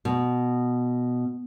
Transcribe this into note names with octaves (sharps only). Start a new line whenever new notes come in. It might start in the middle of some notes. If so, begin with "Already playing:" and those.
B2